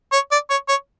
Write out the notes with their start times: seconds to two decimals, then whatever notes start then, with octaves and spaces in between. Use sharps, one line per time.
0.12 C#5
0.32 D5
0.50 C#5
0.69 C#5